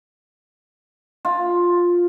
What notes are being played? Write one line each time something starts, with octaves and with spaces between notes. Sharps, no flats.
F4